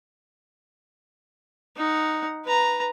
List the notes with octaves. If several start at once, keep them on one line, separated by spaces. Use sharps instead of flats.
D#4 F#5
B4 A#5